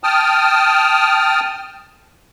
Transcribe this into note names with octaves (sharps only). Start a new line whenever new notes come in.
G5 A5 D#6 F6